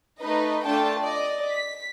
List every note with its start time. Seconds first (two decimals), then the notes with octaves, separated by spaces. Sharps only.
0.19 A3 D#4 B4 D#5
0.65 A3 D4 F4 A4 G5 A5
1.00 D5 D#5
1.50 B6